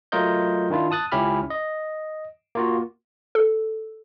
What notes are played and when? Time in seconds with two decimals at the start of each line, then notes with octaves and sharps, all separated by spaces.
0.12 F#3 A3 F4 A#4 D#5 G6
0.70 D#3 D4 E4 F4
0.91 A5 D#6 F#6 A6
1.12 C#2 C#4 E4 G4 B5 F6
1.50 D#5
2.55 A#3 F4 F#4
3.35 A4